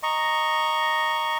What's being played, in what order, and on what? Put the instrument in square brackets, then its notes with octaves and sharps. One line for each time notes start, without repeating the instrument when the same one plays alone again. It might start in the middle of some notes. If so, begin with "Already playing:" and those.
[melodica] D#5 A#5 C#6